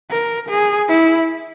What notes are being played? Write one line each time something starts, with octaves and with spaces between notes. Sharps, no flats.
A#4
G#4
E4